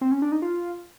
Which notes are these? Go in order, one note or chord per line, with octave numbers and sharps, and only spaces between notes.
C4
C#4
D4
D#4
F4